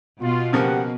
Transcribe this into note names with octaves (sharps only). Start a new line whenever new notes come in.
B2 F4
C#3 F3 A#3 G4 F#5